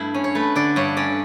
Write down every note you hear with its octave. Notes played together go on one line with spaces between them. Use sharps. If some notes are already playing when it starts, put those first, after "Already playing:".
Already playing: G2 A3 E4
C#4
C#5
A3 B4
D3 D5
G2 C#5
C#4 D5